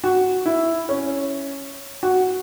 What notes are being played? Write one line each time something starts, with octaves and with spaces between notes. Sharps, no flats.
F#4
E4
C#4
F#4